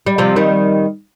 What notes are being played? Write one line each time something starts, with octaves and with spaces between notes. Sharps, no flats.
G3
C3 F3
D#3 G3